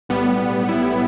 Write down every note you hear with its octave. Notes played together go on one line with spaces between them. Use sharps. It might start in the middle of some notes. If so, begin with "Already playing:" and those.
B1 A2 G3 B3
E4